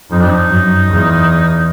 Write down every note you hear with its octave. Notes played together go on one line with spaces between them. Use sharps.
F2 D#4
D4
D#4
F#2
E2